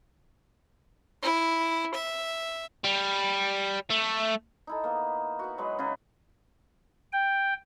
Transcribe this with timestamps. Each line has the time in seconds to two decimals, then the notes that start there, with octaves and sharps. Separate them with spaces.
1.23 E4
1.94 E5
2.84 G3
3.90 A3
4.67 D#4 E4 A4
4.84 A#3 B3
5.39 F#4 B4
5.58 F#3 G#3 B4
5.79 C#3 C#4 D#4 B4
7.12 G5